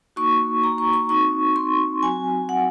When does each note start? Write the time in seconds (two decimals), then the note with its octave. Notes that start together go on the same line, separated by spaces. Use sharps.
0.16 A#3 D#4 F#4 C#6
0.64 A#5
0.78 C#6
0.93 C#6
1.09 C4 D#4 F#4 C#6
1.56 C6
2.02 F#3 C4 F#4 G#5
2.49 F#5